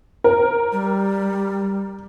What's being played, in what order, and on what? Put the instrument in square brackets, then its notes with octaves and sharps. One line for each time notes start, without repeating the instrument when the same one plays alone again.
[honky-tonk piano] A#4
[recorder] G3